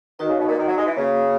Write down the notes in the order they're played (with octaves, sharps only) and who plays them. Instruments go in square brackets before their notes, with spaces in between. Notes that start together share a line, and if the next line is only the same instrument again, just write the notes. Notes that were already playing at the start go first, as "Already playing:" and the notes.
[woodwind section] D#3 [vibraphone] D#4 F#4 B4 D#5
[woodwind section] C#3
B2
A#2
D#3
F#3
G#3
E3
[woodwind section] C#3 [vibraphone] A#3 C#4 F#4 C#5